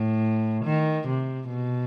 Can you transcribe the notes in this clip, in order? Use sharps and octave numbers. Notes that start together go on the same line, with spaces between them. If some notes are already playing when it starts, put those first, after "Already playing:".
Already playing: A2
D#3
C3
B2